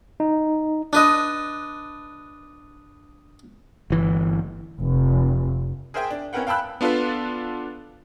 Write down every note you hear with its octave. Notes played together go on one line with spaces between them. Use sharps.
D#4
D4 B4 D#5
G1 E3
F1
G#4 A#4 C5 E5 G5 G#5
D4
C#4 E4 A#4 B4 F#5 G5
F5 G5 A5 B5 E6 F#6
B3 D4 F4 A4 B4